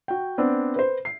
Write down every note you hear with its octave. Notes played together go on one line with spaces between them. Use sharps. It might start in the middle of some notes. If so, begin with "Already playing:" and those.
F#4 G5
B3 C4 D4
B4 C5
C7